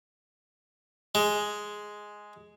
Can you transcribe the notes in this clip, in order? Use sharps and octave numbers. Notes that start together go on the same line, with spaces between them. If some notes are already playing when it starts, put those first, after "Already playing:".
G#3